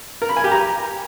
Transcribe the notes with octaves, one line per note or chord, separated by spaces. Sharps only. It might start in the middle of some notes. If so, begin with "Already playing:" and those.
A#4
B5
G#5
G4
A#5